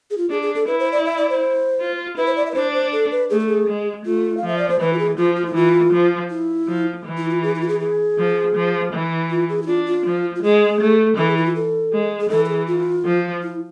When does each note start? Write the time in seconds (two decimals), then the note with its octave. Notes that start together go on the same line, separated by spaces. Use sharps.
0.11 G#4
0.18 F4
0.30 D4 G#4
0.42 G#4
0.55 A4
0.67 E4 B4
0.79 C5
0.92 D5
1.06 E5
1.18 D5
1.30 C5
1.81 F4
2.17 E4 B4
2.26 C5
2.36 D5
2.46 E5
2.51 B4
2.55 D4 C5
2.74 C5
2.92 A4
3.11 B4
3.30 A3 G#4
3.39 A4
3.48 G#4
3.68 G#3
4.05 A3 F4
4.37 F5
4.43 F3 E5
4.58 D5
4.69 C5
4.80 E3 B4
4.93 F4
4.99 G#4
5.17 F3 F4
5.36 F4
5.46 E4
5.55 E3 F4
5.93 F3
6.31 E4
6.68 F3
7.06 E3
7.17 E4
7.30 F4
7.43 G#4
7.55 E4
7.61 F4
7.68 G#4
7.80 G#4
8.18 F3
8.55 F3
8.93 E3
9.30 F4
9.49 G#4
9.62 E4
9.67 D4 F4
9.86 F4
10.06 F3
10.35 F4
10.43 G#3 G#4
10.80 A3
11.17 E3 A4
11.28 G#4
11.37 E4
11.46 F4
11.56 A4
11.93 G#3
12.21 G#4
12.30 E3 A4
12.45 A4
12.49 G#4
12.67 F4
13.05 F3
13.43 E4